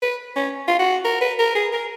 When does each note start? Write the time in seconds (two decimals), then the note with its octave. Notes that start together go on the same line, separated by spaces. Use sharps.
0.02 B4
0.36 C#4
0.68 F4
0.79 F#4
1.05 A#4
1.21 B4
1.39 A#4
1.55 G#4
1.73 A#4